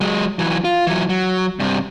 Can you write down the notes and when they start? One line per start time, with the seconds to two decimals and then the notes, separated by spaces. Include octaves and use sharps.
0.01 F#3 G#3
0.39 E3 F#3
0.64 F4
0.87 E3 F#3
1.09 F#3
1.60 G2 C3